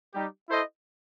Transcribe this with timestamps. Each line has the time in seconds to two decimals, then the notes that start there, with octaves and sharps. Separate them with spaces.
0.14 G3 D#4 G4
0.49 E4 A4 C5 D#5